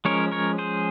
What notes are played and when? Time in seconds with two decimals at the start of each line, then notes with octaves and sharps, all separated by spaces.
0.05 F3 G#3 C#4 A#4 C#5
0.32 A#4 C#5
0.58 G#4 C5